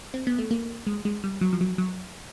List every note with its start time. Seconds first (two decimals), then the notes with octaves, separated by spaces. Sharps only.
0.14 C4
0.27 B3
0.38 A3
0.51 A#3
0.87 G#3
1.05 G#3
1.24 G3
1.41 F#3
1.53 F3
1.61 F#3
1.78 F#3